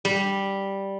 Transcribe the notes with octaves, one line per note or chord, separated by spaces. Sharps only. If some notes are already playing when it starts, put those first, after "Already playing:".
G3